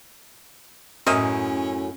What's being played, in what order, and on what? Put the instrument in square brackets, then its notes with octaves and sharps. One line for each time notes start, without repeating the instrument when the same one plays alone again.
[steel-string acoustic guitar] F#2 A2 [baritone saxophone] C#4 [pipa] A#4 D#5 E5